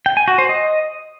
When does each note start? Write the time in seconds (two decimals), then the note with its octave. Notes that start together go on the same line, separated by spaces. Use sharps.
0.06 G5
0.17 G#5
0.28 F#4
0.38 C5
0.49 D#5